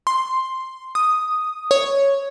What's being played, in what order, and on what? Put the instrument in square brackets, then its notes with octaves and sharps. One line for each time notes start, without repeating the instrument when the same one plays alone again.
[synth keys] C6
D#6
C#5